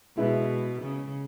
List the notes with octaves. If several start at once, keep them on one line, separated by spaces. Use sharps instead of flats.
B2 G#3 E4 G#4 B4
C#3